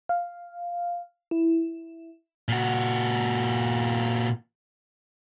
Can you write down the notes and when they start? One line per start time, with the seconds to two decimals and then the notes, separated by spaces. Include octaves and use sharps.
0.09 F5
1.31 E4
2.48 A#2 F#4